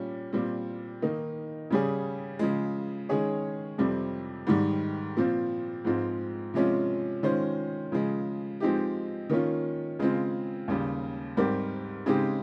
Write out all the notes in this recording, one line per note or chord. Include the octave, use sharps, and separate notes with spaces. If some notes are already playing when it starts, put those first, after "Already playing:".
Already playing: A#2 G3 C#4
A#2 G3 C4
D#3 A#3 D#4
C#3 G3 C#4 G#4
C#3 F3 G#3
D#3 G#3 C#4 G#4 C#5
F2 C3 G3 C4
G#2 D#3 G3
A#2 F3 C4 F4
G#2 F3 G#3 C4 F4
C3 F3 G#3 C#4 F4
D#3 G#3 C#4 F4 C5
C#3 F3 G#3
F3 G#3 C4 D#4 G4
D#3 A#3 C#4 F4
C#3 G#3 C4 F4
D#2 C#3 G3
G#2 G3 C4 G4 A#4
C#3 G#3 C4 D#4 G4